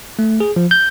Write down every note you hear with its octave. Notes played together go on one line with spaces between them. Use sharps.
A3
G#4
F3
G6